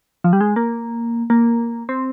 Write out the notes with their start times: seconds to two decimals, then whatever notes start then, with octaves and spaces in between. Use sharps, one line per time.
0.24 F3
0.33 G3
0.41 G#3
0.56 A#3
1.30 A#3
1.89 C4